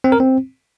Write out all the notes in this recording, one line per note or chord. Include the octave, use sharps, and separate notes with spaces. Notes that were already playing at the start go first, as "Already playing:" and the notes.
C4
A#4
C4